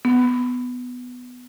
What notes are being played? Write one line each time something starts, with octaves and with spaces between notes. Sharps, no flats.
B3